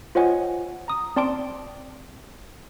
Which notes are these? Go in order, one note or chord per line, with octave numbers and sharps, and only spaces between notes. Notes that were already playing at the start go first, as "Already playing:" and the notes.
F4 C5 C#5 D#5 F#5 G#5
A#5 D#6
C4 D5 A5 C6 D6 D7